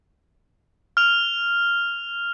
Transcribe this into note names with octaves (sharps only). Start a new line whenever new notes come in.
F6 F7